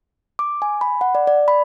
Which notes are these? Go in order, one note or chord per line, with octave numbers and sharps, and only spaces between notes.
D6
G#5
B5
F#5
D5
D5
B5